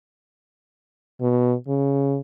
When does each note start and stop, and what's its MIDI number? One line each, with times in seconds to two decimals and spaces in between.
1.21 1.54 47
1.68 2.20 49